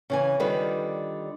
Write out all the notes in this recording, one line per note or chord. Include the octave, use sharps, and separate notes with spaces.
C#3 E3 G#5
D3 D#3 G3 F4 B4